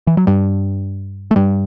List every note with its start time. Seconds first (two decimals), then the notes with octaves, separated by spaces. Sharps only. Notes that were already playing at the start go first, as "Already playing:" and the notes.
0.07 E3
0.17 F#3
0.27 G2 G3
1.31 A3
1.36 G2 G3